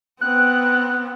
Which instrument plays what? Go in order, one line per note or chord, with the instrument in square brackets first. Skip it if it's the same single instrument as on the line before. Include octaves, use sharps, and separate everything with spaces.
[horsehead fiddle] B3 C4 [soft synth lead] F#6